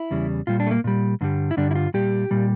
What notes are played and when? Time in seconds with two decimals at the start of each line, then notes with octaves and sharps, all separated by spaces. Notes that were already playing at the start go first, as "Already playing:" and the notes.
Already playing: E4
0.11 E2 C#3 G3
0.47 A#2 G3 F4
0.60 D4
0.67 A3
0.71 A#3
0.84 A#2 G3
1.21 G2 D3 G3
1.51 E4
1.57 G2 D3 G3 D4
1.71 E4
1.75 F4
1.94 A#2 G3 G4
2.31 A#2 G3